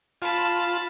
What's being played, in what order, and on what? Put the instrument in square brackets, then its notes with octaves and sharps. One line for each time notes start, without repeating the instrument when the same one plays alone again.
[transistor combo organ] F4 [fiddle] A5 B5